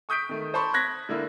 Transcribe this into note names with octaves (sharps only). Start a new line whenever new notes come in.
C#6 D#6 G6 B6 D7
D#3 A3
C5 A5 B5 C#6
F#6 G#6 A#6 B6
D3 A#3 E4